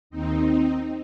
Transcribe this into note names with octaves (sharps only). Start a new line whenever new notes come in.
D#2 D#3 C4 D#4